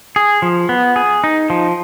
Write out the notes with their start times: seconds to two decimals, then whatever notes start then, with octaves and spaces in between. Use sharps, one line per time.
0.16 G#4
0.42 F3
0.69 B3
0.96 G#4
1.24 D#4
1.50 F3